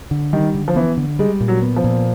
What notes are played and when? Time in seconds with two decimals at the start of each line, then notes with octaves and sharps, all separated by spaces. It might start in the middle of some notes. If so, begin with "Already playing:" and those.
0.11 D3
0.33 D#3 G3
0.55 D3
0.68 F3
0.76 E3 B3
0.97 D3
1.19 G3 G#3
1.41 A#2
1.48 F#3
1.62 B3
1.76 F3
1.84 A#2